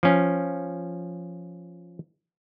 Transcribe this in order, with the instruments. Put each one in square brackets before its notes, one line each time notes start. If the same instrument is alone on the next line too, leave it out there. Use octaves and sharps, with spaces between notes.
[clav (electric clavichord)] F3 C#4